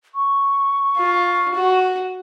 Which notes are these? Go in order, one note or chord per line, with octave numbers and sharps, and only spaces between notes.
C#6
F4
F#4